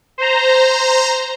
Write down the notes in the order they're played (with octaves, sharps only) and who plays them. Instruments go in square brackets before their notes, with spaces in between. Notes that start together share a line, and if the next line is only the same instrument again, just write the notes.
[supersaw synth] C5 A#5